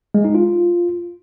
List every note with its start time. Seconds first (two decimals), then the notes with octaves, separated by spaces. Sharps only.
0.15 G#3
0.25 D#4
0.35 F4